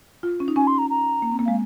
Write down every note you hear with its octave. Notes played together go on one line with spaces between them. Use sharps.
F4
C#4
D#4
C#4 G#5
C6
A#5
A#5
A#3
C4
A#3
G#3 F5